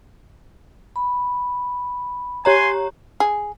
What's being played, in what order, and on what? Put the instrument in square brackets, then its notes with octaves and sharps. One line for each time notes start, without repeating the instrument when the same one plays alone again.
[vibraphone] B5
[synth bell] G4 C#5 A#5 [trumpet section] G#5 C6
[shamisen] G#4